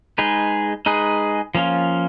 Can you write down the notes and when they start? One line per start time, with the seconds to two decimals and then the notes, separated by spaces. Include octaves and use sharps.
0.18 G#3 D#4 G#4 B4
0.86 G#3 D#4 G#4 B4
1.55 F3 A#3 C#4 F4